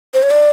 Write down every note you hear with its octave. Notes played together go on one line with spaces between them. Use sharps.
C5
C#5
D5